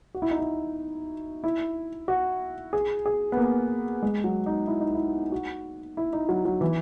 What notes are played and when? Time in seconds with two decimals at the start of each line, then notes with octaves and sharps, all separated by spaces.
0.14 F#4
0.22 E4
0.31 D#4
0.38 E4
1.44 E4
2.08 F#4
2.73 G#4
3.06 G#4
3.32 B3
3.37 A#3
4.03 G#3
4.24 F#3
4.46 D#4
4.67 E4
4.81 D#4
4.94 E4
5.32 F#4
5.97 E4
6.13 D#4
6.29 F#3
6.45 F#3
6.61 E3